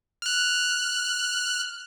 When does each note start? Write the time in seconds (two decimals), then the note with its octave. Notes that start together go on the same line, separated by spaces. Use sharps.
0.22 F6 F#6